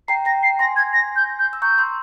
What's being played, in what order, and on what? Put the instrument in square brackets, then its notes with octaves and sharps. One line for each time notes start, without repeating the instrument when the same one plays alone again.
[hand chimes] G5 A#5 [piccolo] C7
[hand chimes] G5 A#5 [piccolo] A#6
[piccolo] C7
[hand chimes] G#5 C6 [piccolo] A#6
[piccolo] G#6
A#6
G6
G6
[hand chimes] E6
[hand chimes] A#5 C#6 [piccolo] G6
[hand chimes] C6 E6